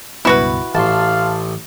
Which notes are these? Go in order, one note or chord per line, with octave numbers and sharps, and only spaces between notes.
C#2 G2 B2 E4 F#4 B4
A1 F5 A5 C6